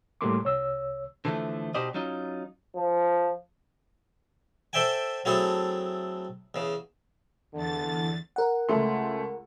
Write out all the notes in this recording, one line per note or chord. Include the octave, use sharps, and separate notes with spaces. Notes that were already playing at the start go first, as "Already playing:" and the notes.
A2 G3 A3 A#3 C6 D6
C2 C#5 E6
D3 E3 F3 G#3 A3
B2 D#4 G4 C5 D5 D#5
F#3 C#4 D#4 F4
F3
A4 C5 D5 E5 G5 G#5
F#3 A3 C4 E4 G#4 A4
E2 C#3
E2 D3 A6
A#4 F#5
C#2 A3 C6